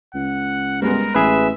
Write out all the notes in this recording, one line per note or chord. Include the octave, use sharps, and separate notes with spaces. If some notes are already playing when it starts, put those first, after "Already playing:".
C#2 F#5
G3 G#3 B3 A#4
A1 G#4 B4 E5